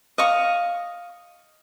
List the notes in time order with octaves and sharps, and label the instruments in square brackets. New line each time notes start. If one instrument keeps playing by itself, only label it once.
[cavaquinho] D#5 F5 C#6